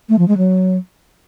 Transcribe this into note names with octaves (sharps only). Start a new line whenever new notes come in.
A3
F3
G#3
F#3